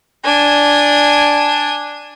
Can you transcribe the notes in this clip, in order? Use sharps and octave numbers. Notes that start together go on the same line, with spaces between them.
D4 G#5